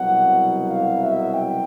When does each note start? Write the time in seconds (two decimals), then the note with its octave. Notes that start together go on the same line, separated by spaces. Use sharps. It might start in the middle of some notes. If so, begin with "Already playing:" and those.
Already playing: C2 B2 F#3 F#5
0.70 F5
1.02 E5
1.33 G5